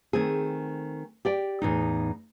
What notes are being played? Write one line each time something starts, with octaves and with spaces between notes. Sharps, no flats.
D#3 A3 C4 G#4
G4 D5 G5
E2 A2 D#4